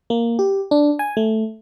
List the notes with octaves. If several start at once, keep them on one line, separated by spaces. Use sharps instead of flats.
A#3
G4
D4
G#5
A3